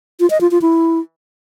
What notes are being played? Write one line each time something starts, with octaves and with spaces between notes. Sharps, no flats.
F4
D#5
F4
F4
E4